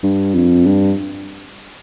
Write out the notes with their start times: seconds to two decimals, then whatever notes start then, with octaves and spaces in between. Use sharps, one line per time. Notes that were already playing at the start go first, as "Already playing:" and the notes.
0.03 G2
0.34 F2
0.66 G2